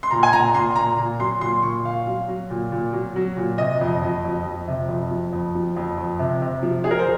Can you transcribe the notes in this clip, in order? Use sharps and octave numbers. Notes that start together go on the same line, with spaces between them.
C6
A#2 A#5
G#5
A#2 A#5
A#2 C6
A#2 A#5
A#2
F#3 C6
A#2 C6
A#2 C#6
A#2 F5
F#3
F#3
A#2
A#2
F#3
F#3
A#2
C3 D#5
F2
F2
F2
F3
C3
F2
F3
F2
F3
F2
F2
C3
C3
F3
F3 G#4
A#4
C5